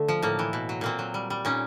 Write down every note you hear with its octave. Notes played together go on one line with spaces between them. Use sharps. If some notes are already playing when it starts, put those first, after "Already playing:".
Already playing: D3 A3
F3
A2 A#3
E3
B2
F#3
A#2 A#3 C4
F#3
G3
G3
A#2 C#4 D#4